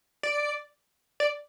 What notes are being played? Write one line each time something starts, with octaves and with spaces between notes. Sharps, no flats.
D5
D5